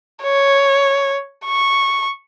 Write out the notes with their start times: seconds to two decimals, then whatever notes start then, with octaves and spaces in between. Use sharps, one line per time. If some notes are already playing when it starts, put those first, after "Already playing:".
0.22 C#5
1.46 C#6